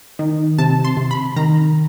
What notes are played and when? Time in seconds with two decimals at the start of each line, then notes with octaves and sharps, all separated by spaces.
0.19 D#3
0.59 C3 A5
0.84 C6
0.97 C3
1.11 B5
1.36 D#3 A#5